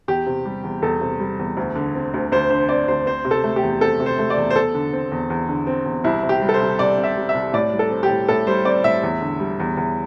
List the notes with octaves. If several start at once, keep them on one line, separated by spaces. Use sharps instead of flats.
E2 G4
C3
G3
E2
E2 A4
C3
G3
E2
D2
D3
C4
D2
D2 C5
D3 C5
C4 D5
D2 C5
C4 C5
C3
A4
A3
G4
E2
C4 A4
C3
C5
A3
D5
E2
C5
E2 A4
D3
C4
E2
E2
D3
C4
E2
C2 E4
C3
G4
G3
A4
C5
C2
C2 D5
C3
E5
G3
E5
C2
A2 D5
G3
A4
C4
G4
A2
A2 A4
G3 C5
C4 D5
A2 E5
E2
D3
G3
E2
E2